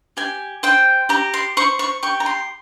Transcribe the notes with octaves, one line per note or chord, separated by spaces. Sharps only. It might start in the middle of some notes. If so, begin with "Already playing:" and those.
G4 G#5
C5 G5
G4 A#5
C6
C5 C#6
C#6
G4 C#6
A#5
C6